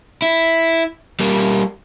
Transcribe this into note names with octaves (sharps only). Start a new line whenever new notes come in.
E4
G3 A#3